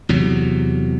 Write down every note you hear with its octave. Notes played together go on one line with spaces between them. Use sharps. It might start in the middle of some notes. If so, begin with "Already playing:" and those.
E2 C3 F#3